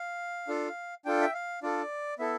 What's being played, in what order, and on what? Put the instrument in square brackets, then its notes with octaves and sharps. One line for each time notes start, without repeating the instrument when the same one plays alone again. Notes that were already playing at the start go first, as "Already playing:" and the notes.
Already playing: [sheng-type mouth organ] F5
D4 F4 A4
D4 F4 A4 G5
E5
F5
D4 F4 A4 D5
B3 E4 A4 E5